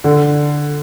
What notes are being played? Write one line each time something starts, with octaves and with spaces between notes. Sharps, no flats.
D3